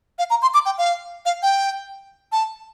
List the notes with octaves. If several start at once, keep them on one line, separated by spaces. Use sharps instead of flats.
F5
A#5
C6
D6
G5
F5
F5
G5
A5